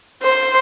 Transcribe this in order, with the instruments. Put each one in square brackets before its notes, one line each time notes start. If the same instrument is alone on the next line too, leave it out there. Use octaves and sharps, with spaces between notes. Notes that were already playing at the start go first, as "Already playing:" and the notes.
[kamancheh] C5